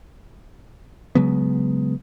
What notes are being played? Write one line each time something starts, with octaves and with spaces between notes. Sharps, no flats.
C#3 F#3 G#3 B3